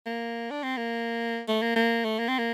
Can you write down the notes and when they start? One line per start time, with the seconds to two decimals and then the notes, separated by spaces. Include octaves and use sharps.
0.06 A#3
0.51 D4
0.63 C4
0.77 A#3
1.48 A3
1.62 A#3
1.76 A#3
2.04 A3
2.19 A#3
2.28 C4
2.38 A#3